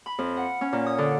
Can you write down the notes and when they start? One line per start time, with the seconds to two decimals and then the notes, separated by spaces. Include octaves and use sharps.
0.06 B5
0.18 F2
0.37 F#5
0.61 C#4
0.73 A#2
0.86 D#6
0.98 D3